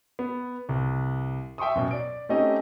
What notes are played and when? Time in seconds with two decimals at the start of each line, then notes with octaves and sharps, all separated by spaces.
0.19 B3
0.69 C2
1.58 E5 G5 C6 C#6 D#6
1.76 F#2 B2
1.91 D5 D7
2.29 A3 C4 C#4 D#4 G4 D#5